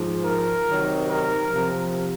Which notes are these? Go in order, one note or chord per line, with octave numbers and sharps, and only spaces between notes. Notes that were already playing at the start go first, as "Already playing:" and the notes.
Already playing: G#2 F3
A#4
C3 D#3 F#3
A#4
C3 F3